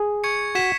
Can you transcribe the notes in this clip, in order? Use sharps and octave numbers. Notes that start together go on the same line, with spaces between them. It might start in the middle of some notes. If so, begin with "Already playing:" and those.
Already playing: G#4
C#6 G#6 C#7
F#4 C#6 G#6 B6 E7